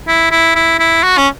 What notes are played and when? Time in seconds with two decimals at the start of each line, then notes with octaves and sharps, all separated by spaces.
0.08 E4
0.31 E4
0.56 E4
0.80 E4
1.03 F#4
1.17 C#4